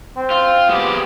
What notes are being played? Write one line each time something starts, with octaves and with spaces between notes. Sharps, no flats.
C4
F4
G#3 B3 G4